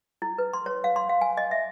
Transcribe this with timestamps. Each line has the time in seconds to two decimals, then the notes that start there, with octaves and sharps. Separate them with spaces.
0.22 E4
0.38 B4
0.53 C6
0.66 C#5
0.84 F5
0.96 C6
1.09 F5
1.21 G#5
1.37 D#5
1.51 E5